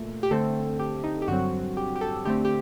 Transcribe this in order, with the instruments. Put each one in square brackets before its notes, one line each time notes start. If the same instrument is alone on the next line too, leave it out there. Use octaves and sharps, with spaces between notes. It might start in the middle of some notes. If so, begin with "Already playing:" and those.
Already playing: [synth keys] A#2 A3
G4
D3 A3 C4 A4
G4
D#4
G4
G2 D3 F#3 C4 F#4
G4
G4
A4
D3 A3 C4 G4
G4